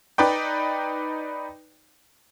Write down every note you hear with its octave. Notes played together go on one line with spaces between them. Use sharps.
D#4 B4 D5 G5